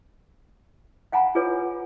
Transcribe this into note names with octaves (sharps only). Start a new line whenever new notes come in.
F5 F#5 G#5 A#5 B5
F4 G#4 A4 B4 C#5